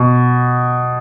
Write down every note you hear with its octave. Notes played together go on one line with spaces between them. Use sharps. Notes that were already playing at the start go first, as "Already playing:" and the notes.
Already playing: B2